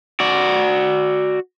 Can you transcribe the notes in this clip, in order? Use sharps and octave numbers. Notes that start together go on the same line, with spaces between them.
F#4 D5